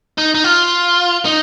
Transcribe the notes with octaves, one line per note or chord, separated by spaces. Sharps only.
D#4
D#4
F4
D#4